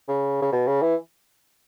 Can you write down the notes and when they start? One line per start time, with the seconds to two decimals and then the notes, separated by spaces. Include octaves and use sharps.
0.08 C#3
0.42 C#3
0.52 B2
0.67 C#3
0.82 E3